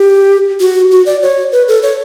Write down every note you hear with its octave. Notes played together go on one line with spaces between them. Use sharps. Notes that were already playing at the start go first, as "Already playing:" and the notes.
Already playing: G4
F#4
F#4
D5
C#5
B4
A4
C#5